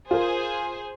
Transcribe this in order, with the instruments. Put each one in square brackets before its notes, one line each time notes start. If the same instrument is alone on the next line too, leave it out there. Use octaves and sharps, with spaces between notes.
[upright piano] F4 A#4 [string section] G#4 C5